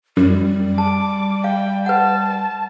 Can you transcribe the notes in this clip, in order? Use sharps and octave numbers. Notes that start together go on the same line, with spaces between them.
F#2 G3
A5 D6
F5 G5
B4 F#5 A5